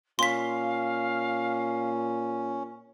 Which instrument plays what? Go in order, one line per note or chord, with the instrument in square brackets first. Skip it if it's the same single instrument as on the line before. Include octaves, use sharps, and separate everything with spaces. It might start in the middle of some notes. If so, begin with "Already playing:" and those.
[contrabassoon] A#2 [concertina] C#4 [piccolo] F5 [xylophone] C6 B6